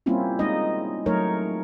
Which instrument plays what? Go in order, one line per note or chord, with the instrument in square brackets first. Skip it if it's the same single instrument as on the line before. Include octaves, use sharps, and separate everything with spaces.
[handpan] G3 A#3 C4 C#4 E4 F4
G#3 D#4 D#5
F#3 A3 D#4 A#4 C#5